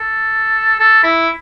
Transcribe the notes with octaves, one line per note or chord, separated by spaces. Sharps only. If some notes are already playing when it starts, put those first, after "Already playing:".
Already playing: A4
A4
E4